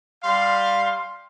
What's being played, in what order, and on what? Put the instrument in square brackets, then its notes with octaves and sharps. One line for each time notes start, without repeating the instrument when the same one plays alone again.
[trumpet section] G3 F5 C6